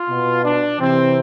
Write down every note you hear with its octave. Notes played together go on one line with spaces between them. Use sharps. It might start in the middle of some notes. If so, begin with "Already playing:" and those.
Already playing: F4
B2
D4
C3 E3 C4